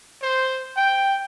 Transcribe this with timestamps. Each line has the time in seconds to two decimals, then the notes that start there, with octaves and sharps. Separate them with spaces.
0.22 C5
0.77 G5